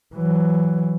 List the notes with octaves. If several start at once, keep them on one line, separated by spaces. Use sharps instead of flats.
E3 F#3